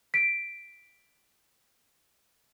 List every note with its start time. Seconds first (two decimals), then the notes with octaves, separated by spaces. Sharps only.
0.14 B6 D7